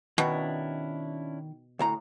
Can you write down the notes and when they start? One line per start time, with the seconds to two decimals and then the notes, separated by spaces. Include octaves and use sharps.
0.18 B2 D#3 C#4 D4 E4
1.79 D2 A2 A#5